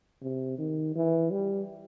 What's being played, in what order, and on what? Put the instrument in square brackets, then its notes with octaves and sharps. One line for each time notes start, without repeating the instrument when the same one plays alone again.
[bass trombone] C3
D#3
E3
G3